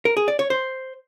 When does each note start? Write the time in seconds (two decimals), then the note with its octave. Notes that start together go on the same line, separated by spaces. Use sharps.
0.05 A#4
0.17 G#4
0.28 D5
0.39 C#5
0.50 C5